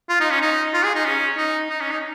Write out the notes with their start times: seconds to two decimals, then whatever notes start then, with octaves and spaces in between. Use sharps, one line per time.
0.09 F4
0.20 D#4
0.30 C#4
0.42 D#4
0.74 F4
0.84 G#4
0.96 D#4
1.05 C#4
1.37 D#4
1.70 D#4
1.80 C#4
1.91 D#4